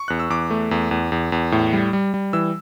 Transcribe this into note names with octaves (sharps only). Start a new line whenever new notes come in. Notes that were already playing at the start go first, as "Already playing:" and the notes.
Already playing: C#6
E2 F#6
E6
E2 D6
A3
E2
E2
E2
E2
A2
G3
G3
G3
E3 E6